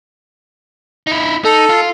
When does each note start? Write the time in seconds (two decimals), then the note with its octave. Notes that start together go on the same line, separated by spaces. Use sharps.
1.07 D#4 E4
1.45 D#4 A4
1.70 F4